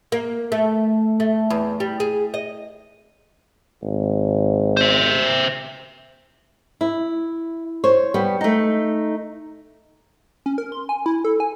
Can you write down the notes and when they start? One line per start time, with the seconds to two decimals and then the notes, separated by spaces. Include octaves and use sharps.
0.12 A#3
0.52 A3
1.20 A3
1.50 E2
1.80 G3
2.00 G#4
2.34 D#5
3.82 G#1
4.77 C5 E5
6.81 E4
7.84 C5 C#5
8.14 G3 B3
8.41 A3 D#4
10.46 C#4
10.58 A#4
10.72 C6
10.89 G#5
11.06 E4
11.25 A4
11.40 G#5